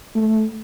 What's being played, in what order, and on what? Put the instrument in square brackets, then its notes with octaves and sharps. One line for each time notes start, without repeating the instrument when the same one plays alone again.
[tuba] A3